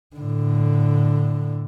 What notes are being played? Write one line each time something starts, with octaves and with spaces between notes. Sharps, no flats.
A2 D3